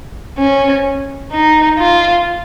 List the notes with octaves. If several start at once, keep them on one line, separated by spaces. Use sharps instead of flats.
C#4
D#4
F4